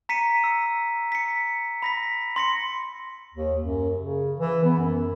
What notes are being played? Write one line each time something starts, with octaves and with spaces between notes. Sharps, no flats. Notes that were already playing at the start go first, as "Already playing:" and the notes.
A#5 B6 C#7 D#7
E6
B6 C#7
B5 A#6 B6
C6 A#6 C#7
D#2
F#2
C#3
E3
B3
F#2